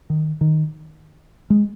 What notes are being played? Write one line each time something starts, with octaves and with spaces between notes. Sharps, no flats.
D#3
D#3
G#3